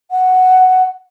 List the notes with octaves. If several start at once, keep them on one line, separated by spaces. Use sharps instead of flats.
F#5